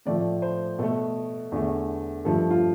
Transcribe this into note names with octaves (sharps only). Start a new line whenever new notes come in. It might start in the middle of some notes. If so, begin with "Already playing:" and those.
A2 F3 A3 D5
C5
B2 A3 A4
E2 D3 A3
G2 F3 A3 A4
F4